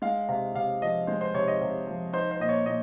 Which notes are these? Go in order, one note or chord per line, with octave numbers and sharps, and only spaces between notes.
G#3 F5
C3 F5
C3 F5
F3 D#5
G#3 C5
C5
C3 C#5
D#5
C3
F3
D#4 C5
C5
A#2 D#5
C#5
A#2 D#5